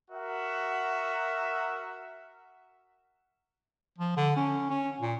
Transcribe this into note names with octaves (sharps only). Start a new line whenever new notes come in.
F#4 A#4 E5 F#5
F3
D3
C#4
C#4
A#2